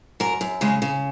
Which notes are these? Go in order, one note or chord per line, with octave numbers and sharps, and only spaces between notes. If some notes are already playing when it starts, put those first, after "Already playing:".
F#2 A#4
F#2
C#3 G#3
C#3